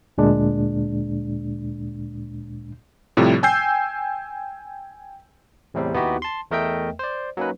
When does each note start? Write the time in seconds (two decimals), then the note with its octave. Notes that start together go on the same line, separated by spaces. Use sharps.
0.18 D2 A#2 G#3 D4
3.17 A2 C3 F3 G3
3.43 G5 G#5 E6 G6 C7
5.74 E2 A2 C3 G3 C4
5.94 D#2 B3 D#4 E4 F#4 G4
6.22 A5 C6
6.51 E2 A3 A#4 D#5 E5 G5
6.99 C5 D5
7.37 F#3 A#3 C#4 D#4 B4